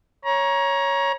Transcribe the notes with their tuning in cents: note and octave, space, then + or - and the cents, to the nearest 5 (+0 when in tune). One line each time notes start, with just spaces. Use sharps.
C#5 +0 A#5 +25